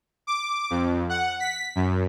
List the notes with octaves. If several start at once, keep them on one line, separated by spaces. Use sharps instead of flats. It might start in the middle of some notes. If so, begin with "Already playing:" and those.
D6
F2
F#5
B6
F#2